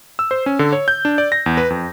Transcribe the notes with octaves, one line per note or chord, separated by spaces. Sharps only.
E6
C5
C#4
D3
C#5
G6
D4
D5
A#6
E2
B4
F2